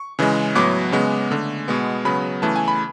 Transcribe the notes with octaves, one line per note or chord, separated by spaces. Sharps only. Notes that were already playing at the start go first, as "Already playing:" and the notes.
Already playing: C#6
C#3 E3 G#3
A2 F#3 B3 D6
C#3 G#3 B3
D3 A3
B2 G#3 B3
C#3 F#3 B3 B5
C#3 E3 A3 A5
G#5
B5